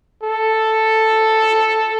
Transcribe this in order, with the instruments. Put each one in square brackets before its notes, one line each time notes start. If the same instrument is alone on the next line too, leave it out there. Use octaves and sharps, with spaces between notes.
[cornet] A4